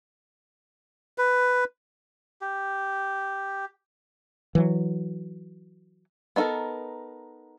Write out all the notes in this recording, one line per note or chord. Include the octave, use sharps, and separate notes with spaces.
B4
G4
E3 F#3
B3 D#4 F4 A4 A#4